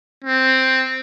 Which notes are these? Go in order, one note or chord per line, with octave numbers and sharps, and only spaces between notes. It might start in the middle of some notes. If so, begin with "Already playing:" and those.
C4